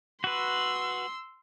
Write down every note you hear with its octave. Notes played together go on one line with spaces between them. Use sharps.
F#4 B4 C6 E6